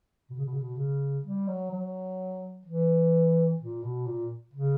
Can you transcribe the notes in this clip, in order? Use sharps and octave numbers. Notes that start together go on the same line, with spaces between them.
B2
C#3
B2
C#3
B2
C#3
G3
F#3
F#3
E3
A#2
B2
A#2
C#3